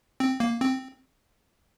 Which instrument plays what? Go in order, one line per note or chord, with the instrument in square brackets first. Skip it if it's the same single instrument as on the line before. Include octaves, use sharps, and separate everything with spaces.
[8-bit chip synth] C4
A#3
C4